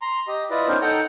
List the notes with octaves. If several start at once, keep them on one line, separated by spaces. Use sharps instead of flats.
A#5 C6
G4 D#5
E4 F4 B4 D5 D#5
B3 C#4 D#4 A#4 C5
D#4 A4 F#5 G5 A#5 G6